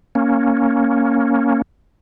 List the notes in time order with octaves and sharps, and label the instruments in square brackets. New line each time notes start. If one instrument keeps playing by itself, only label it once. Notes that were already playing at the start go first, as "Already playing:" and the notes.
[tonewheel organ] A#3 C#4